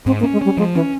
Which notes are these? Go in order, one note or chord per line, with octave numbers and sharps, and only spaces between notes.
G#2 C4
A#3
C#4
G#3
G3 C#4
F3 G#3
E3 C#4